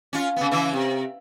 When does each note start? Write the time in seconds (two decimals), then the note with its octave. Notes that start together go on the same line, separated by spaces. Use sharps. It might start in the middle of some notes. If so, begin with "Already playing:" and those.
0.13 C#4 F4
0.36 C#3 B3
0.51 C#3 E3 E4
0.73 C3